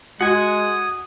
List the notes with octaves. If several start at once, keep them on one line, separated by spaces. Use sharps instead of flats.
G#3 F#4 F#5 G#5 D#6